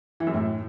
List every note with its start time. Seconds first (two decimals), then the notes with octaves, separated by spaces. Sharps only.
0.20 E3
0.27 F#2
0.34 A2